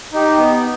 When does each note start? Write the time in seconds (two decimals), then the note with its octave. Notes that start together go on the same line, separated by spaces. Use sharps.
0.13 D#4 G4
0.38 B3